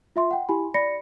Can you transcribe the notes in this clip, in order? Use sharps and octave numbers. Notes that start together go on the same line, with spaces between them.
F4 E5 C6
F#5 G5
E4 G4 G#5 B5
D5 B5 A#6 C#7